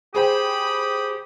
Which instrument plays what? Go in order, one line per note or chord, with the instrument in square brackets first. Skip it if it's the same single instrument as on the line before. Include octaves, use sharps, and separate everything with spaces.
[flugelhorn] G4 [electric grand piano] G#4 C5 G5 [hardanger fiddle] B5 [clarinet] D#6